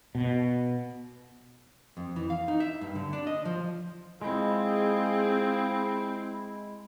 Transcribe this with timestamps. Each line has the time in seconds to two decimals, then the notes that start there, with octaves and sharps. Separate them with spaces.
0.15 B2
1.97 F2
2.16 E3
2.30 F5
2.48 D#4
2.60 E5
2.81 G2
2.95 D3
3.13 D4
3.27 D#5
3.45 F3
4.22 G#3 C4 E4 F4 G#4